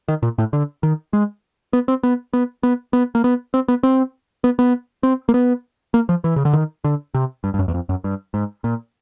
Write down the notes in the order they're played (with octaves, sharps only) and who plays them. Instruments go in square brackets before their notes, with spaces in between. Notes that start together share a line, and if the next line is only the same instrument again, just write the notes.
[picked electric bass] D#3
A#2
A2
D3
D#3
G#3
B3
C4
B3
B3
B3
B3
A#3
B3
C4
B3
C4
B3
B3
C4
A#3
B3
A#3
F3
E3
C#3
D3
D#3
D3
C3
G2
G2
F#2
E2
F2
F#2
G2
G#2
A#2